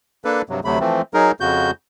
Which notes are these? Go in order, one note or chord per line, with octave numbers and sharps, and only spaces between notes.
A#3 D4 A4 B4
G2 C3 F#3
D2 C3 F#3 A3 B5
E3 F3 A3 C4
F#3 D#4 G#4 A#4
F2 C#3 F#4 G6